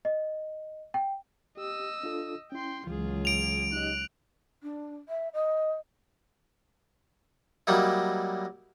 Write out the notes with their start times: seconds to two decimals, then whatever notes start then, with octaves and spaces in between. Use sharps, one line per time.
0.05 D#5
0.94 G5
1.57 G4 D#5 E6
2.03 D4 F4 A4
2.52 C#4 E4 G5 C6
2.87 C#2 E3 F#3 G#3 F4 G#4
3.25 D7 F7
3.73 D#4 G4 D#5 F#6
4.63 D4
5.09 E5
5.33 D#5
7.67 F#3 G3 A#3 D#4 E4